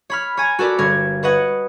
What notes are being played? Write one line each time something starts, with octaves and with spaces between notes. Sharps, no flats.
C#5 B5 F6
C#5 G#5 A#5
F#4 A4 A#4 D5 B5
G1 A#4 C#5 G#6
B4 C#5 D#5 F#5